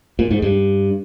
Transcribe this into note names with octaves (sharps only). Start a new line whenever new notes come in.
A#2
G#2
G2